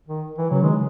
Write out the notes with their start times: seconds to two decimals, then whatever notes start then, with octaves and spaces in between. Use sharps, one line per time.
0.08 D#3
0.38 E3
0.50 C#3 F#3
0.63 D#3 G#3